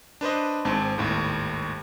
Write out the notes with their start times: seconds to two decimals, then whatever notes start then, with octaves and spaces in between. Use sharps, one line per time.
0.21 D4 B4 C5 D#5
0.65 G#1 G#2 C4 A5
0.98 G#1 D#2 A2